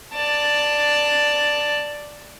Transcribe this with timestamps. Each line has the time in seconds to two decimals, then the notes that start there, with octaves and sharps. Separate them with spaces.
0.14 D5 A5